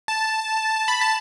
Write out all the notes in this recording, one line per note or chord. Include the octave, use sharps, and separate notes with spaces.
A5
B5
A5